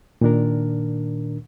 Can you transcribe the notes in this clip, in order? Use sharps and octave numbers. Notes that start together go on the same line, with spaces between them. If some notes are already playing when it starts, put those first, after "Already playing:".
A#2 D#3 D4 A#4